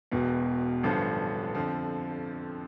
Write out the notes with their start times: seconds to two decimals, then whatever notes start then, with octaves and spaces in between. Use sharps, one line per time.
0.12 E1 E2 B2
0.83 A1 G2 D3 F3
1.55 F2 D3 F3